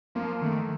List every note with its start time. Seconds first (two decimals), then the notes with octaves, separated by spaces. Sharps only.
0.15 F3 A#3
0.42 D#3 A3